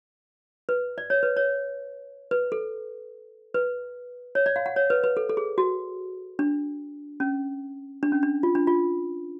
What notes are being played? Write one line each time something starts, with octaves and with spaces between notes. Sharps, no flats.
B4
D5
C#5
B4
C#5
B4
A4
B4
C#5
D5
F5
F#5
C#5
B4
B4
A4
A4
G#4
F#4
D4
C#4
D4
C#4
D4
F4
D4
F4